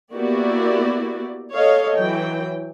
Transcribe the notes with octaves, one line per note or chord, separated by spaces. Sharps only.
A#3 B3 E4 F#4 G4 D5
A4 C#5 D#5 F5
E3 F#3 G5